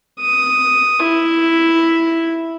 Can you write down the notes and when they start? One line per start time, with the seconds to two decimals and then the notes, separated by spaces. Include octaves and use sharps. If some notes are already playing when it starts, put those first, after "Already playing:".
0.21 D#6
1.02 E4